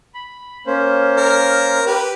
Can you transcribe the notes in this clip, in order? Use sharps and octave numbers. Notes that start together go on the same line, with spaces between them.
B5
A#3 C#4 C5
A#4
G4 B4